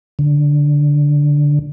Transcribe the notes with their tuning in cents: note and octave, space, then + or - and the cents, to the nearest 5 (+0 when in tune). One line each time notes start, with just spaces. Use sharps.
D3 -5